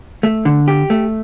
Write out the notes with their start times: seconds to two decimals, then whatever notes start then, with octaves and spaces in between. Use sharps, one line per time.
0.23 A3
0.45 D3
0.68 G4
0.90 A3